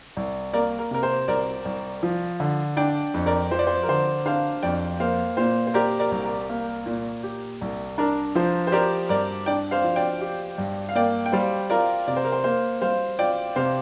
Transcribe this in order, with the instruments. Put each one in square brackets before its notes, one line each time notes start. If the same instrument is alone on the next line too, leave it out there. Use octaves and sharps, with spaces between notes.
[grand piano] C2
[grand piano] A#3 [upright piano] A#4 D5
[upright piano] A#4
[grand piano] C3 [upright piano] A#4
[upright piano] C5
[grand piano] C2 [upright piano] A#4 D5
[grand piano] C2
F3
D3
[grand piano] D4 [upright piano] D5 G5
[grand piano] F2
[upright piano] A#4 D5
[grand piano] F3 [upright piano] C5
[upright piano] D5
C5
A#4
[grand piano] D3 [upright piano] C5
[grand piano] D4 [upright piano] C5 F5
[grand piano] F2 [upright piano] D5 G5
[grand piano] A#3 [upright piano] C5 F5
[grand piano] A#2 [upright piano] C5 F5
[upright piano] C5
[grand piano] G4 [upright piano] A#4 D5
[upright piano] A#4 D5
[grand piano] C2
[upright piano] A#4
[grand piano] A#3
A#2
G4
C2
[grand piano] D4 [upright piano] A#4
[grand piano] F3 [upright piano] C5
[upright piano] C5
[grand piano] G4 [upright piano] A#4 D5
[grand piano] G2 [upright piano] A#4 D5
[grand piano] D4 [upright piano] D5 G5
[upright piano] C5 F5
[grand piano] F3
[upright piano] D5 G5
[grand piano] G4
G2
[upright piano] F5
[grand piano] A#3 [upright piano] D5 G5
[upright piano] G5
[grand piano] G3 [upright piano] C5 F5
[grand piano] F4 [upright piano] A#4 D5
[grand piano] C3 [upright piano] D5
[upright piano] C5
A#4
C5
[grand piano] A#3 [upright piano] C5
[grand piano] G3 [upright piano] C5 F5
[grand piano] F4 [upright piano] D5 G5
[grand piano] C3 [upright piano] C5 F5